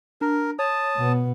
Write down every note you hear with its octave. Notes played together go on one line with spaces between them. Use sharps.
D4 A#4
C#5 A5 D#6
B2 B3